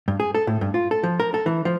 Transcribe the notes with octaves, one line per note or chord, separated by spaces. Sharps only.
G2
G#4
A4
A2
G2
F4
A4
F3
A#4
A4
E3
F3